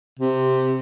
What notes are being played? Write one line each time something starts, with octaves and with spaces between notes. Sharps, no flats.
C3